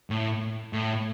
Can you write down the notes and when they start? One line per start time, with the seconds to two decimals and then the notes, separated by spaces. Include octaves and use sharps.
0.10 A2
0.73 A2